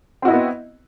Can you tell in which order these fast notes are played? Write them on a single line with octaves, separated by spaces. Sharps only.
C4 F#4 E4 D#5 B3